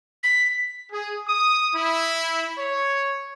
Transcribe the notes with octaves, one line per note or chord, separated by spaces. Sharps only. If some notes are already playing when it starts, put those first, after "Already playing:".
B6
G#4
D#6
E4
C#5